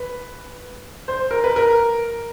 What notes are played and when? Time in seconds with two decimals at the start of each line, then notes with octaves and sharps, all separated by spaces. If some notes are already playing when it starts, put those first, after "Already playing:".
Already playing: B4
1.08 C5
1.31 A#4
1.44 B4
1.56 A#4